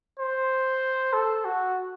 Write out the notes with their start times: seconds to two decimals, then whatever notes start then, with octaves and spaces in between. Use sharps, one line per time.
0.19 C5
1.13 A4
1.45 F#4